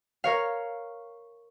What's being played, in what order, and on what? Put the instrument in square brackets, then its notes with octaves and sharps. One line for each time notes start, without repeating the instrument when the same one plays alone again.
[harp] A#4 C#5 F5